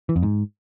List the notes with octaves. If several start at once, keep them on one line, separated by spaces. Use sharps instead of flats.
E3
F2
G#2